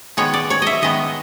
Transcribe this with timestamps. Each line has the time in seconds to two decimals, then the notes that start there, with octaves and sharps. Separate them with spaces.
0.17 D#3 G#3 B3 C#5
0.34 D5
0.50 C#5
0.62 D#5 E5
0.82 D#3 G#3 B3 D#5